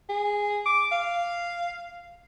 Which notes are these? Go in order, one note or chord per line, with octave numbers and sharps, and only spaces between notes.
G#4
D6
F5